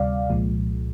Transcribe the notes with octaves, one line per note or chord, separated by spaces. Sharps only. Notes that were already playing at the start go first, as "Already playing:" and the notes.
Already playing: D2 C3 G3 D5 F5
C2 A#2 F3 G#3